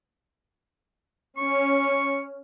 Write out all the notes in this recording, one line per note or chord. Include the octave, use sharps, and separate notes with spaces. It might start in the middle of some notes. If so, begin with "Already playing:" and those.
C#4 C#6